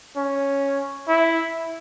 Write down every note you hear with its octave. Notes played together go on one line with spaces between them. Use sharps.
C#4
E4